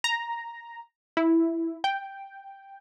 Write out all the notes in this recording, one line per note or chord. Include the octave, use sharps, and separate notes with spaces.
A#5
E4
G5